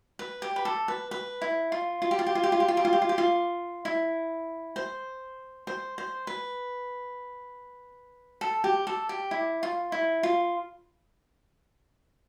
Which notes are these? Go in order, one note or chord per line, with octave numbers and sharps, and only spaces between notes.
B4
G4
B4
A4
B4
B4
E4
F4
F4
G4
F4
G4
F4
G4
F4
G4
F4
G4
F4
G4
F4
G4
F4
E4
C5
C5
C5
B4
A4
G4
A4
G4
E4
F4
E4
F4